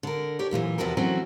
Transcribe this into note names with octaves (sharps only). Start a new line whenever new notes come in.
D3 A#4
G4 C#5 D5
F#2 A#2 D#3 E3
E2 C3 F3 F#4 A4 A#4
E3 F#3 A3 C4 C#4 F#4